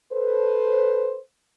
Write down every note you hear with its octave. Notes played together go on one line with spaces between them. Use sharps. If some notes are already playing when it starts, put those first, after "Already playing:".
A4 B4 C5